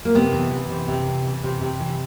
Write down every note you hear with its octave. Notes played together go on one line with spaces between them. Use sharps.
A#3
C3 B3
E3
E3
C3
C3
E3
E3
C3
C3
E3